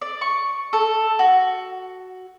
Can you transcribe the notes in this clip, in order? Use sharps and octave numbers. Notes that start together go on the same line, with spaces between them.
D5
C#6
A4
F#4